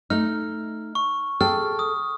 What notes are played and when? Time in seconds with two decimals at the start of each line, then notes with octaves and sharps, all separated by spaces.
0.10 A3 D#4 F6
0.95 C#6
1.41 G#4 A4 G5 F6
1.79 D#6